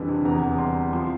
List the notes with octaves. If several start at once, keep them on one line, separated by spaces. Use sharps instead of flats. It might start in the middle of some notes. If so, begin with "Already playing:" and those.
Already playing: F2 D3 E3 G3
C3
E2 A#5
E2
G3 C6
C3
F3 C6